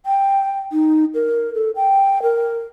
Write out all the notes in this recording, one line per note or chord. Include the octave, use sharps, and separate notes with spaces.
G5
D#4
A#4
A4
G5
A#4